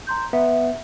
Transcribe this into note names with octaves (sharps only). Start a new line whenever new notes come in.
A#5 C6 G6
B3 E5